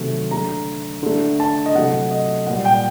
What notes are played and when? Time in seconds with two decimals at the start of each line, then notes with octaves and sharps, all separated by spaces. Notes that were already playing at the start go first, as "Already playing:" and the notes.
Already playing: C3 D#3 F#3 A3
0.31 D3 A3 A#5
1.03 D3 A3
1.40 A5
1.66 D#5
1.75 C3 F#3 A3 F#5
2.11 D#5
2.47 A#2 G3 F#5
2.65 G5